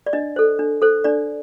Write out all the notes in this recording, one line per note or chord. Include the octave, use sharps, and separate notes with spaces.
D5
D4 D#5
A4 C5
D4
A4 C5
D4 D5